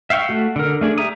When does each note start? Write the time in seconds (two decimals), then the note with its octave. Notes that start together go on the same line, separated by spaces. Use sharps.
0.10 E5 F5 G5 C#6
0.29 A3 F#4
0.56 D3 A#4
0.81 A3 D4 G#4
0.98 G4 E5 A#5 D#6